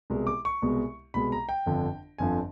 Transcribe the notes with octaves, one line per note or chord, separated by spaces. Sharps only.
C2 B2 G#3 B3
D6
C#6
C2 B2 G#3 B3
C2 B2 G#3 B3 B5
A#5
G5
G1 F2 D3 F3
G1 F2 D3 F3 G#5